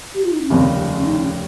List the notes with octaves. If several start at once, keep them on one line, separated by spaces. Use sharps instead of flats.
G4
F4
D#4
C#4
F1 D#2 C#3 G3 C4
C#4
D#4
C#4